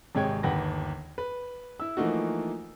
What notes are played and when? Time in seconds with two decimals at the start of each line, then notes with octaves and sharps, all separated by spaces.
0.15 G#1 C3 G#3 C#5 G5 G#6
0.43 G1 D#2 B4 F#5 G5 A#6
1.18 B4
1.80 E4 E6
1.97 E3 F3 A3 A#3 D#4 F#4